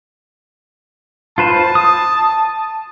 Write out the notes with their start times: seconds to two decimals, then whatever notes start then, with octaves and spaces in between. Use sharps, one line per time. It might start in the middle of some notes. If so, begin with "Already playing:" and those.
1.38 F4 B4 C5 A5
1.75 D#6